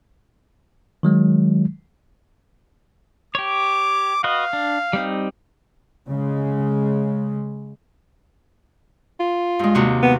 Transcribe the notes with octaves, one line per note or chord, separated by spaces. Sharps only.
D#3 F#3 G#3
G4 C#5 D6
F#4 B4 D#5 F5
D4
G3 C4 D#4
C#3 G#3
F4
G2 G#3
D#2 C3 F#4
B3